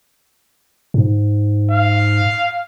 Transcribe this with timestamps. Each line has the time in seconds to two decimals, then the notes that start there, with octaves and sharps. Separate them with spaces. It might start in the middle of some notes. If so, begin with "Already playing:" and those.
0.94 G#2
1.70 F5